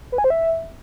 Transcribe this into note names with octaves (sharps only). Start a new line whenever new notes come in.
B4
G#5
C5
E5